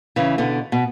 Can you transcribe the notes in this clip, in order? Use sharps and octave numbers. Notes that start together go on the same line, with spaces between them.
C#3 E3
B2 D3
B2